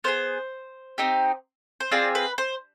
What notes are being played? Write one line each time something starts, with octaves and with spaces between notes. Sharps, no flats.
B3 D4 G#4 C5
C4 D#4 G4
C5
C4 F4 G#4 D5
B4
C5